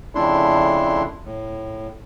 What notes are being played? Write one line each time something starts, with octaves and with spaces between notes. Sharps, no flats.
F2 C#3 A3 D4 E4 C6
A2